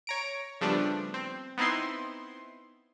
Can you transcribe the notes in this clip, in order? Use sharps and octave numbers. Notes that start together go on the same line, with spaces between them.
C#5 A#5 D7
C#3 F3 G3 A3 B3 D4
C4
B3 C4 D#4 E4 C6